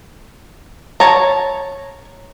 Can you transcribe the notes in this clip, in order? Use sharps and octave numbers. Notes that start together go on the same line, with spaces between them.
C#5 A5 A#5